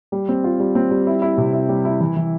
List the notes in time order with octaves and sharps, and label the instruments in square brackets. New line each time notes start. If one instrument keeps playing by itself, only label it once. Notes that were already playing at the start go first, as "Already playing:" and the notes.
[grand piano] G3
C4
F4
G3
C4
G3
E4
E4
C3
E4
G3
E4
E3
E3